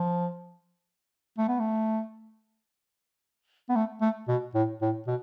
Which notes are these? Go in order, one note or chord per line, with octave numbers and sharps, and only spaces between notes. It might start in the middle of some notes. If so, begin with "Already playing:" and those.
Already playing: F3
A3
B3
A3
B3
A3
A3
B2
A2
A2
B2